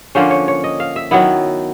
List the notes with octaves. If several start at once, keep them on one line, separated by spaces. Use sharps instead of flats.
D3 F3 A#3 C#4 C5
C#5
C#5
D#5
F5
E5
D#3 F#3 B3 E4